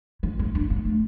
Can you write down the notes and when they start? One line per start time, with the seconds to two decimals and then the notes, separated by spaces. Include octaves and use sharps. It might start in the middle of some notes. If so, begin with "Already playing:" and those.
0.23 E3
0.39 B3
0.55 D4
0.70 B3
0.85 A3